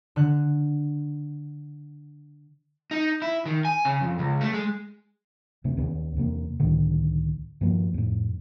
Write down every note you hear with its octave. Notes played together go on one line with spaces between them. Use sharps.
D3 F#6
D#4
E4
D#3
G#5
C#3
F2
C#2
A3
G#3
D#1 C3 A3 C#4
D#2 B3 C#4
E2 C3 A#3
C#2 A2 D3 D#3
G2 F3 A#3
F2 A2